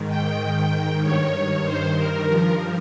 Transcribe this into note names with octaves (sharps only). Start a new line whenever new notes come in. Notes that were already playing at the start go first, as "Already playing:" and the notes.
Already playing: G#2 D#3
G5
G2 D#3 C#5
C5
A#4
G2 F3